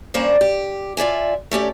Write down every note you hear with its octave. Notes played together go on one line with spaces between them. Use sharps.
G2 A#3 C#4 C5 D5
G4
F4 D5 E5 G#5
A3 C#4 G4 D5